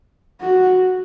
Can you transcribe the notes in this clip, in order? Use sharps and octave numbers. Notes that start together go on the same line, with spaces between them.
F#4